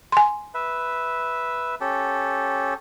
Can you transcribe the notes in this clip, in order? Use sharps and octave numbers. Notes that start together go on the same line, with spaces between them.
G#5 C6
B4 E5
C#4 G4 A4